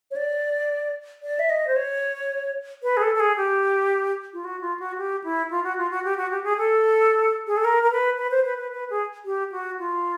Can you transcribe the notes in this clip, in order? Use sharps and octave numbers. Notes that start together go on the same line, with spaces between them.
C#5
D5
D5
E5
D#5
C5
C#5
B4
G#4
A4
A4
G#4
G4
F4
F#4
F4
F#4
G4
E4
F4
F#4
F4
F#4
G4
F#4
G4
G#4
A4
G#4
A4
A#4
A#4
B4
B4
C5
B4
B4
B4
G#4
G4
F#4
F4